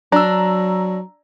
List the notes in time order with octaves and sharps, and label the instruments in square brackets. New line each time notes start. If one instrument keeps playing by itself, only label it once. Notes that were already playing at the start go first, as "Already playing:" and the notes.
[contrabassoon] F#3 [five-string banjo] D4 [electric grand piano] A#5 E6